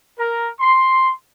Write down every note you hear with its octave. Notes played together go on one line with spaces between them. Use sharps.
A#4
C6